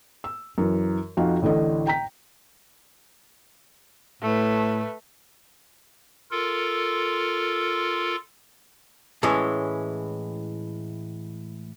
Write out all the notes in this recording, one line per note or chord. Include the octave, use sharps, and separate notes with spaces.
E6
F#2 E3
F2 D#4 F#4 F5
A1 A2 D3 D#5
G5 A#5 B6
A2 A3 B4
F4 A4 A#4
A2 E3 G#3 C#4 C#5